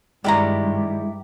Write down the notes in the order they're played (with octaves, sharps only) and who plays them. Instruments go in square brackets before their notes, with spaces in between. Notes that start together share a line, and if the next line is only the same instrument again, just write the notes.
[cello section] G2 [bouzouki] D#3 E3 G3 [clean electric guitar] G#3 E4 [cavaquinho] G4 A#5